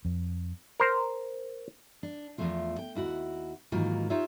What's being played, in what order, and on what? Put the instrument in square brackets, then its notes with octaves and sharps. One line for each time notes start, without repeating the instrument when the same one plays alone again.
[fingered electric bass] F2
[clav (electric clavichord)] A#4 C5 A#5
[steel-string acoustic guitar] D4
E2 G#2 F3 A3 F4
G5
D#2 E4 F#4 F#5
G#2 D#3 E3 F#3 A#3 F4
D#4 F4 G4 C#5 E5